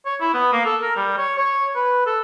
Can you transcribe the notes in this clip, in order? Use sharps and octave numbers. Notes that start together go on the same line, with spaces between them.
C#5
E4
B3
A#3
A4
A#4
G3
C#5
C#5
B4
A4